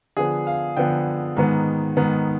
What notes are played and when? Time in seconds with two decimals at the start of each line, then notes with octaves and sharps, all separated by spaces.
0.17 D3 F3 B3 G#4
0.47 F5
0.77 D3 F3 B3 G5
1.37 G#2 D#3 B3
1.97 G#2 D#3 B3